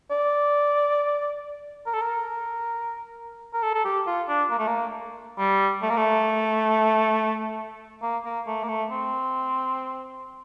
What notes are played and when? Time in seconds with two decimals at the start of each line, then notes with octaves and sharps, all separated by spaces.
0.11 D5
1.86 A#4
1.94 A4
2.02 A#4
3.53 A#4
3.63 A4
3.75 A4
3.85 G4
4.07 F4
4.28 D4
4.51 A#3
4.59 A3
4.67 A#3
5.39 G3
5.82 A3
5.90 A#3
5.97 A3
8.03 A#3
8.25 A#3
8.47 A3
8.63 A#3
8.68 A3
8.91 C4